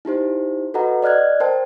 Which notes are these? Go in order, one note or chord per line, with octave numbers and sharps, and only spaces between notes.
D#4 E4 G4 C5
F#4 A4 B4 D#5 F#5 A#5
D5 D#5 F6 F#6 G#6
A#4 C5 G5 A5